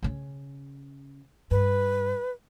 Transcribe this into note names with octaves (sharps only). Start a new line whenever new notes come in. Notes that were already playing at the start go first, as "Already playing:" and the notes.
C#3 C#4
G2 B4